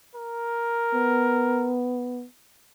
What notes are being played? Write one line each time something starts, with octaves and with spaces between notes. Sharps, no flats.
A#4
B3